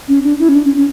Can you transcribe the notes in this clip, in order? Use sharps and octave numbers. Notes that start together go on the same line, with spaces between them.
C#4
D4
E4
C#4
D4
C#4
C#4